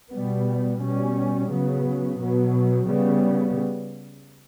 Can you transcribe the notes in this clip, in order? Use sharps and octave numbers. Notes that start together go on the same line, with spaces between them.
B2 G3 B3
B2 G3 C#4
C#3 F#3 B3
B2 F#3 B3
C#3 G3 B3